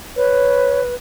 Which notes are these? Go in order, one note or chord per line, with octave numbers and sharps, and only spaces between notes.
B4 C#5